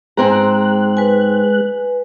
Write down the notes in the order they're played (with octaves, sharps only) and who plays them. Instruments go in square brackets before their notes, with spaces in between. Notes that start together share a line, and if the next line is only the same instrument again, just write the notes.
[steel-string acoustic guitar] G#2 C4 A#5 [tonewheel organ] G#3 F#6
[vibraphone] B4 G#5